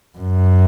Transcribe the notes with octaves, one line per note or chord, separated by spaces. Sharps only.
F#2